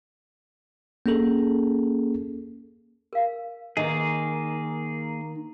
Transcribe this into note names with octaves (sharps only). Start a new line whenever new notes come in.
A#3 C#4 G#4 A4
A#4 F5
D#3 A#3 G#4 A#4 D#5